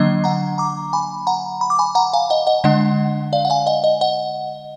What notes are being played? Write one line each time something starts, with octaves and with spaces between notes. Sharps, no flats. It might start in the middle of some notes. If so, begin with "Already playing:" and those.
Already playing: D3 F#3 A#3 D4 D#5
F#5 A#5
A#5 D6
G#5 B5
F#5 A#5
B5
D6
G#5 B5
F#5 A#5
F5 G#5
D#5 F#5
D#5 F#5
D3 G#3 D4 D#5 F#5
D5 F5
F#5
F5 G#5
D#5 F#5
D#5
D#5 F#5